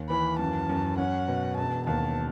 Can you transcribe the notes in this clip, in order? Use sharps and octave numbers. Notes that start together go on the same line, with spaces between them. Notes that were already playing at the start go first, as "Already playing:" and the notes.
Already playing: D#2
E3 B5
F#2 A5
F#2
C#4 F#5
B2
E1 A5
D#2 A5